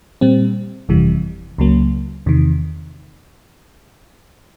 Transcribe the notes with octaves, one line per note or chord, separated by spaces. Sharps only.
A#2 G3 C4
G1 F2 C3 E3 G3
C#2 C#3 F#3 A#3
E2 C3 D#3